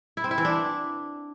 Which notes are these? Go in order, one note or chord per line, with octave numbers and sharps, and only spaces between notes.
E4
C4
E4
E3
D4